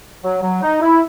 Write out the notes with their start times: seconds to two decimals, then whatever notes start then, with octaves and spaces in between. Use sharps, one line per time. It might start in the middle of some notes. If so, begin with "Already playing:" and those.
0.24 F#3
0.43 F#3
0.62 D#4
0.82 E4